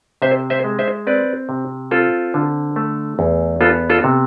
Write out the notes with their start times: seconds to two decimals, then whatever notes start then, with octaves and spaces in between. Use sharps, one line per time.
0.22 C3 C5 E5
0.50 C5 E5
0.64 G#3
0.79 C5 E5
1.07 C4 B4 D5
1.49 C3
1.91 C4 F4 A4
2.34 D3
2.76 A3
3.19 E2
3.61 B3 F4 A4
3.90 F4 A4
4.04 C3